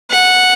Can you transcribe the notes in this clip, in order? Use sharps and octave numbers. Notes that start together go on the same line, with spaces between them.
F#5